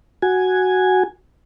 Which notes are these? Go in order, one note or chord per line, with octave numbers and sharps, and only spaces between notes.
F#4 G#5